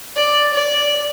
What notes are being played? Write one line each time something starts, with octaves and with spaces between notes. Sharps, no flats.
D5
D5